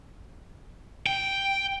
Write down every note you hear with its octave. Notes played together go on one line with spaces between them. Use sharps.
G5